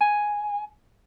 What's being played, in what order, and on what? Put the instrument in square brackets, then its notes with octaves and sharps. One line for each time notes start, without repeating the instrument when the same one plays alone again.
[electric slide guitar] G#5